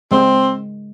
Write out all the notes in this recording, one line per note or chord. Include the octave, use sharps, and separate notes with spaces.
G#3 C4